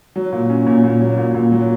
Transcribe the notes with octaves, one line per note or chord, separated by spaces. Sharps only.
F#3
A#2
C#4
A#2
A#2
F#3
A#2
A#2
F#3